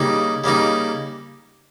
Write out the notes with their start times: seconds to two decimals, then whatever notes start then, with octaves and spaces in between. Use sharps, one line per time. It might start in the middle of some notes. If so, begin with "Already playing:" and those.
Already playing: C#3 G3 A#3 D#4
0.44 C#3 G3 A#3 D#4